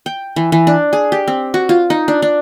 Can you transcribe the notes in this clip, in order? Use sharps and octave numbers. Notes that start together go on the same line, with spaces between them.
G5
E3
E3
D4
G#4
G4
C4
F#4
F4
D#4
D4
D4